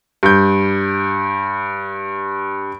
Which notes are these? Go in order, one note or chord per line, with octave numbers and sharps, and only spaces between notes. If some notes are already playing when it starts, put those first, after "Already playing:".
G2 G6